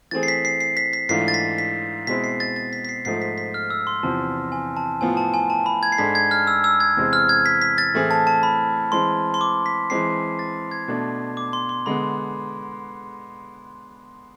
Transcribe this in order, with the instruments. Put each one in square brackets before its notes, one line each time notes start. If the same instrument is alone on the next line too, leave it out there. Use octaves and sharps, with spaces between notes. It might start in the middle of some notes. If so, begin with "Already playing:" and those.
[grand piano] E3 A3 C4 G#4 [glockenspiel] A6
[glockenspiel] C7
B6
C7
C7
B6
B6
[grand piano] G#2 E3 A3 D4 F4 [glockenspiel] C7
[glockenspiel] A6
B6
B6
[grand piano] B2 G#3 C4 E4 [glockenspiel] B6
[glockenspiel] C7
A6
A6
B6
B6
C7
[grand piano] G#2 F3 A3 [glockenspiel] C7
[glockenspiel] B6
B6
F6
E6
C6
[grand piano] E2 C3 F3 [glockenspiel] A5
[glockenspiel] G#5
A5
[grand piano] A2 F3 B3 F4 [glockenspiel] G#5
[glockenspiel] A5
G#5
A5
B5
G#6
C7
[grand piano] G#2 G#3 D4 A4 [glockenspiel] B6
[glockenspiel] G#6
F6
E6
E6
G#6
[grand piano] E2 C3 G#3 C4
[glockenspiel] F6
G#6
B6
B6
A6
[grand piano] A2 E3 A3 C4 G#4
[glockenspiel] A5
A5
B5
[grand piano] E3 G#3 C4 [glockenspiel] C6
[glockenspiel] C6
D6
B6
[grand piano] E3 G#3 C4 [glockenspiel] C7
[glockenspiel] A6
G#6
[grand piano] B2 A3 D4
[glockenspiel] D6
C6
C6
[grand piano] D3 G#3 B3 [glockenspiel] B5